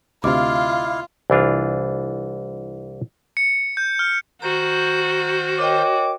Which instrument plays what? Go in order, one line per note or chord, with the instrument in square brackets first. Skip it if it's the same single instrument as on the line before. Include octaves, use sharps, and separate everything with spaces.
[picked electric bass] D2 C3 [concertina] E4 F5 [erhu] F4 [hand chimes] D#5 D6
[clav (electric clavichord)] C2 E3 D4 F4
[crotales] C#7
G6
F6
[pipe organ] D#3 C5 G6 [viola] F#4 [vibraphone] A#5
[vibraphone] A#4 D#5 G5 [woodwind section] C#5 D6